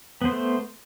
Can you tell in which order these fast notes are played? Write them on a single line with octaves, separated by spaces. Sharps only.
B3 C5 A3